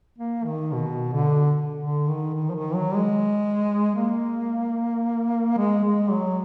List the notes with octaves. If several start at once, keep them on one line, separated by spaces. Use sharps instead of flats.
A#3
D#3
B2
D3
D3
D#3
D#3
F3
D#3
F#3
G#3
A#3
G#3
G#3
F#3